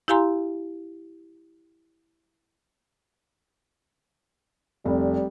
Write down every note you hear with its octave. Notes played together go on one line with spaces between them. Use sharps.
E4 G4 F5 G#5 A#5 C6
F1 G3